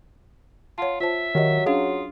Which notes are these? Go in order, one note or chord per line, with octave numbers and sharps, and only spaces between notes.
F4 C#5 F#5 A5
F4 C5 E5 A5
D#3 F#3 G4 D#5
C#4 D4 F4 G#4 F5